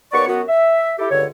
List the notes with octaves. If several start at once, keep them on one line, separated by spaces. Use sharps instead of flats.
D#2 B3 C#5 D5 C#6
F#2 B3 F#4
E5
E4 G4 A4
C#2 G2 D3 C#5